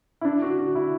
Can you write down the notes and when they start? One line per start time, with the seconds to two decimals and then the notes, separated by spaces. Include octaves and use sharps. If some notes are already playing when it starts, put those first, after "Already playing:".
0.21 E4
0.25 D4
0.42 F#4
0.58 F#4
0.75 E4